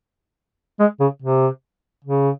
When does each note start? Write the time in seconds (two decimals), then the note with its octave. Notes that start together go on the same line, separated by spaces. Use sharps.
0.80 G#3
1.00 C#3
1.22 C3
2.05 C#3